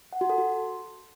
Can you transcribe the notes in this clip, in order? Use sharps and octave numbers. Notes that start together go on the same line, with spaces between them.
F#5
F#4
A4
F#4